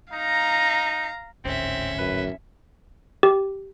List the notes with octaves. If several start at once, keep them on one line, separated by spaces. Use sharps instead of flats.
D#4 F5 A#5
D1 G#1 D2 C4 C#4 E5
F#2 B4
G4